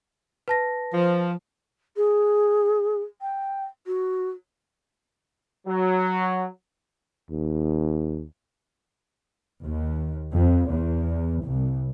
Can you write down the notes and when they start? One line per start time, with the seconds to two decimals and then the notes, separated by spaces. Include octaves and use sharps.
0.48 B4 A5 A#6
0.94 F3
1.96 G#4
3.21 G5
3.86 F#4
5.67 F#3
7.30 D#2
9.62 D#2
10.32 F2
10.70 E2
11.44 C2